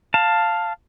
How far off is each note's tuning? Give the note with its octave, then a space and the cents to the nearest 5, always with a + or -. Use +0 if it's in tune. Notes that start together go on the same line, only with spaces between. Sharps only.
F5 +0 A5 +10